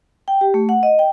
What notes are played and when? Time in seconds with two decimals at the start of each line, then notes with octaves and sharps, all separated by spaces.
0.28 G5
0.41 G4
0.54 A3
0.69 F#5
0.83 D#5
0.99 G5